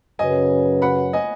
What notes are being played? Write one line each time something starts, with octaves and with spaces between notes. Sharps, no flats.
F#2 C#3 F#3 C#4 B4 D#5 G#5
F#5 B5
D#5 G#5